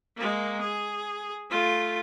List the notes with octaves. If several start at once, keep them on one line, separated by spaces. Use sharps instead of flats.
G#3 A#3
G#4
A3 F4